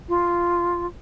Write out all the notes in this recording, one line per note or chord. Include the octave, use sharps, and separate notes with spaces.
F4